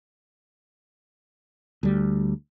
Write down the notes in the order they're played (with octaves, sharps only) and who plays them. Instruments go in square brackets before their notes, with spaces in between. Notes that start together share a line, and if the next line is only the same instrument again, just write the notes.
[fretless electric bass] D2 G3